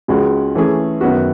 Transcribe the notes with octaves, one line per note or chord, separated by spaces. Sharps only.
C#2 C#3 G#3 C#4 F#4
E3 A3 C#4 G#4
F#2 D#3 F#3 B3 F#4